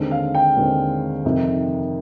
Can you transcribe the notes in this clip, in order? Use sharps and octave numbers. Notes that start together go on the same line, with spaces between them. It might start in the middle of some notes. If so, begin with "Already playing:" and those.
Already playing: D#2 D3 G#3 C4
F5
G5
D#2 D3 G#3 C4
F2 C3 D#3